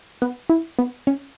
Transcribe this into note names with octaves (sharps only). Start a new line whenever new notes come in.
B3
E4
B3
C#4